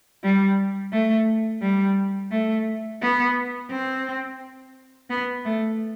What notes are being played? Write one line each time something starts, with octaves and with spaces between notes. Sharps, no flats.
G3
A3
G3
A3
B3
C4
B3
A3